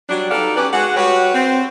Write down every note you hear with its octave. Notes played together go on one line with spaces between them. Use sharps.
F#3 G3 D4
B3 D#4 G4 A4 D5 F5
C#4 G4 B4
G#3 F#4 F#5
G3 F#4 G4 B4 C#5
C4